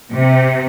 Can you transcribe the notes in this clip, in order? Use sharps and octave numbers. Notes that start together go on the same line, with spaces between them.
C3